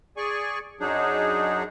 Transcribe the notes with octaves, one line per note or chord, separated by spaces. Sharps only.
G#4 D5 G#5 C#6
F#2 F#3 D4 D#4 G#4